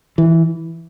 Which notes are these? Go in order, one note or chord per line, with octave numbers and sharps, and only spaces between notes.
E3